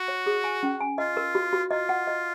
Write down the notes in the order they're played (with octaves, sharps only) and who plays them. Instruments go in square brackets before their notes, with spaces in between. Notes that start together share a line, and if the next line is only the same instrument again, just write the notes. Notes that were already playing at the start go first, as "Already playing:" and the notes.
Already playing: [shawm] F#4
[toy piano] C#5
G#4
G#5
C#4
G#5
[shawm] F4 [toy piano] D#5
[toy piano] A#4
F#4
F#4
[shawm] F4 [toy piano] D#5
[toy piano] F#5
D#5